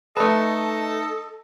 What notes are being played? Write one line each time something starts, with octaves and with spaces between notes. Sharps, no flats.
A3 D#4 A4 B4 D#5 A5